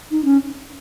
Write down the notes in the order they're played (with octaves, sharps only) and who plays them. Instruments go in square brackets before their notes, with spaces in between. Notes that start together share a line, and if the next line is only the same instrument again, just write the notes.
[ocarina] D#4
C#4